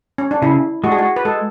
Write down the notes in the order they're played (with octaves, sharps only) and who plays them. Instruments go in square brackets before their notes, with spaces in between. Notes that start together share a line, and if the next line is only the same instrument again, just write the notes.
[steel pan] C#4
D4
[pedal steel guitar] C#3 [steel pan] E4
[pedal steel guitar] G#3 [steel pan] F#4
[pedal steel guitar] D4 [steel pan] G#4
[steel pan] F#4
B4
[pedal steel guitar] G#3 [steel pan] A4